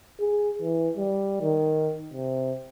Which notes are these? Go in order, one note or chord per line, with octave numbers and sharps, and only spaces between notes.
G#4
E3
G3
D#3
C3